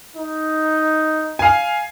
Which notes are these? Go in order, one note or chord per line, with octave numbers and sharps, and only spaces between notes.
D#4
F5 G#5